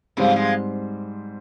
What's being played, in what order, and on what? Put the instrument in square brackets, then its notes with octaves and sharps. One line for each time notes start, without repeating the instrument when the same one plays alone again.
[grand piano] G#2 G3 C4 [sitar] C#3 F3
[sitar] F3 G#3